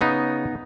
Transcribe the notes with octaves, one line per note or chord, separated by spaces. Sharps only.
C#3 B3 D#4